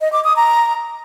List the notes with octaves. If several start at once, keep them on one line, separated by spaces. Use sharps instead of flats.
D#5
D6
D#6
A#5